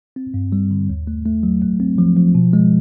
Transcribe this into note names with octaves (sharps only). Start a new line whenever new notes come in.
C4
G2
G3
D3
D#2
A3
A3
F#3
A3
C4
F3
F3
B2
G#3